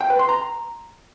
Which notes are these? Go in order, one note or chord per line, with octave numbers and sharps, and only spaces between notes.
G5
B4
C6
A#5